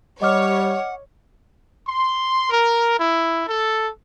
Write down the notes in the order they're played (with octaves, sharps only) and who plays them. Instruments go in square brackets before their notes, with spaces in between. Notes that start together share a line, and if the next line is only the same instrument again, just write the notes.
[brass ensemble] G3 [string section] C#5 [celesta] D#5 D6 F6 [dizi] F#5
[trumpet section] C6
A#4
E4
A4